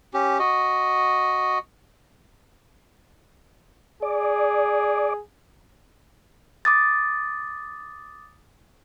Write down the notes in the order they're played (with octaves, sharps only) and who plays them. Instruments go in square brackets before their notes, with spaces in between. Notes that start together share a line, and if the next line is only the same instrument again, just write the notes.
[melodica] C#4 G4
F#4 D#5
[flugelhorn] G#4 [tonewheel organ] D5
[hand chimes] D6 D#6 A6